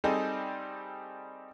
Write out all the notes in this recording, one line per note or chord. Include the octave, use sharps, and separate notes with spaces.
G3 C4 D#4 G#4 A4